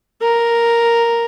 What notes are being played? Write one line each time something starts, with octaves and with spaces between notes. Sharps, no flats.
A#4